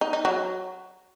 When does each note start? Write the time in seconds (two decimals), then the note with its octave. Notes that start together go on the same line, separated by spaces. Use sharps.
0.01 D#4
0.13 D#4
0.25 F#3